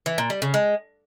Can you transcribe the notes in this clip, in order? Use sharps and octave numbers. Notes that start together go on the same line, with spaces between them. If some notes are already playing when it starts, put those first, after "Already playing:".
E3
A#2
G3
C#3
G#3